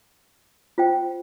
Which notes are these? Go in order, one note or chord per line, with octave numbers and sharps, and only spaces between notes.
F4 C5 G5